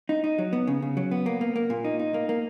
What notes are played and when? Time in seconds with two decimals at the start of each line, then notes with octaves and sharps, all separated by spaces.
0.09 D#4
0.24 D#4
0.38 F#3
0.53 B3
0.67 C#3
0.82 C#3
0.97 F#3
1.11 B3
1.26 A#3
1.41 A#3
1.56 A#3
1.70 A#2
1.84 D#4
1.99 D#4
2.14 A#3
2.29 A#3